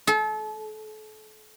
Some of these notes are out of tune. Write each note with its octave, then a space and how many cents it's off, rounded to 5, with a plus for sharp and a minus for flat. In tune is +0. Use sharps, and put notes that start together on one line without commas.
A4 -35